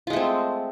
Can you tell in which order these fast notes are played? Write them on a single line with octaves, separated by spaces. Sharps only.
F4 G#3 A3 C4